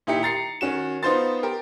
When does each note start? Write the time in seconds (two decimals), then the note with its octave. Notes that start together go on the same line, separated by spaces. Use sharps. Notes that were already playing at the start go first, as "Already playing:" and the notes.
0.07 A#2 D#4 E4 G4 C#7
0.23 A#5 A6 C7 C#7
0.61 D#3 C#4 F#4 E7
1.03 B3 D#4 F4 C5 C6 A6
1.43 G4 A#4